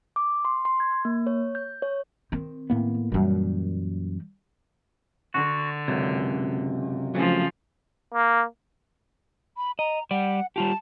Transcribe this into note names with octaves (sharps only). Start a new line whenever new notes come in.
D6
C6
C6
G#6
A#3
C#5
G6
C#5
D#3 C4
A2 A#3 B3
F#2 A#2 E3 G3
D3 F#4
C#2 F#2 C3
C#3 F3 F#3 A3 C4
A#3
B5
D#5 A#5
G3 D5 F#5
G3 F4 G4 A5